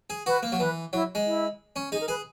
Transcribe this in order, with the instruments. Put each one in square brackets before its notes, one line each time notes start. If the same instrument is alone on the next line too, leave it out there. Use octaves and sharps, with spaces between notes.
[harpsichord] G#4
[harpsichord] F#4 [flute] B4
[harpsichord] A#3
F#3
[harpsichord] E3 [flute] B4
[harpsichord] F#3 [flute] E4
[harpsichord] G#3
[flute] E4
[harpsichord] C#4
[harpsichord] D#4 [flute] G#4
[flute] A#4
[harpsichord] G#4 [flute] B4